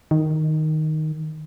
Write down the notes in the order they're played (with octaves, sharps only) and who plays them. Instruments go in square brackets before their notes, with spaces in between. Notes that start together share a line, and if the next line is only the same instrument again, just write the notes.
[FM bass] D#3